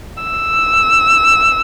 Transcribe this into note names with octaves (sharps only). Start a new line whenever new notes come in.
E6